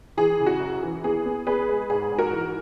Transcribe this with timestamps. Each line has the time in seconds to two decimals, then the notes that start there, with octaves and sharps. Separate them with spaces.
0.17 E3 G#4
0.40 C#3
0.46 F#4
0.60 F#2
0.83 E3
1.04 B3 G#4
1.26 B3
1.47 B3 G#4 B4
1.69 G#3
1.90 G#2 G#4
2.12 G#2
2.18 F#4 A#4
2.33 E3